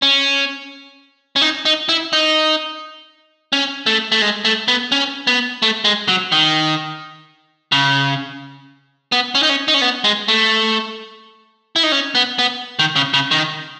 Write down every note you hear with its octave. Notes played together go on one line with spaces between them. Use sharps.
C#4
C#4
D#4
D#4
E4
D#4
C#4
A3
A3
G#3
A3
B3
C#4
B3
A3
G#3
F#3
D#3
C#3
B3
C#4
D#4
C#4
D#4
C#4
B3
G#3
A3
E4
D#4
C#4
B3
B3
D#3
C#3
C#3
D#3